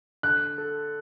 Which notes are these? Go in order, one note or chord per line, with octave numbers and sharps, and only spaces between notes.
D3 F#6
A4